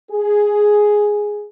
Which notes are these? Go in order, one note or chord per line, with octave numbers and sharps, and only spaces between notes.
G#4